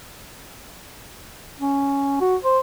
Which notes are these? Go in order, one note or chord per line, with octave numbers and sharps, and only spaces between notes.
C#4
F#4
C5